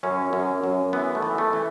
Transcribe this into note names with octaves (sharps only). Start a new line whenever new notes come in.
F#2 C#4
F#2
F#2
E3 B3
A3
E3
A3
E3